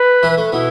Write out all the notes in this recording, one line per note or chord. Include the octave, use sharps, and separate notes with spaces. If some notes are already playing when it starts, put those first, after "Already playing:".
Already playing: B4
E3 E4
A3
B2 B3 E4